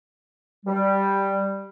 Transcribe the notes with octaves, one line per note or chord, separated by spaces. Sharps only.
G3